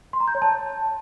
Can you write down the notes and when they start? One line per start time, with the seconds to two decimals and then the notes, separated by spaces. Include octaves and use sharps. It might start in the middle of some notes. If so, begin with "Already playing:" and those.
0.13 C6
0.20 A#5
0.28 G6
0.35 C#5
0.42 A5